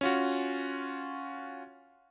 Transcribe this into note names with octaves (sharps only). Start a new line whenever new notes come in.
C#4 F4 F#4